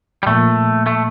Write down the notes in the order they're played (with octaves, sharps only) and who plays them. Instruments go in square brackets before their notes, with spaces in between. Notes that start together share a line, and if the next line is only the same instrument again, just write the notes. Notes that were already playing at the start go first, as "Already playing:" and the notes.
[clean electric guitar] G3
[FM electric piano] A#2 F3 A#3 [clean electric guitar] A3
[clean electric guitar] A3